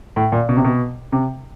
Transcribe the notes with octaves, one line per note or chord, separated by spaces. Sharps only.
A2
A#2
B2
C3
B2
C3